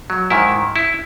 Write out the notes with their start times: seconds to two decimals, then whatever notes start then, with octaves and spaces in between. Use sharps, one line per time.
0.10 F#3
0.30 G#2 D#3 E4
0.76 E4